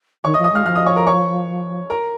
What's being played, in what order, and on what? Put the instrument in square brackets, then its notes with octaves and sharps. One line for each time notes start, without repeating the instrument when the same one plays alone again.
[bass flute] D#3 [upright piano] C#5 C#6
[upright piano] D#5 D#6
[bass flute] F3
[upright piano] D#5 D#6
[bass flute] G#3 [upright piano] F5 F6
[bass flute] F3 [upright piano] F5 F6
[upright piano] D#5 D#6
C#5 C#6
A#4 A#5
C#5 C#6
A#4 A#5